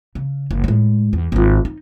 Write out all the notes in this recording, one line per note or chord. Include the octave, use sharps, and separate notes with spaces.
C#3
F#1
A2 G#3
E2
G#1 F4
D#4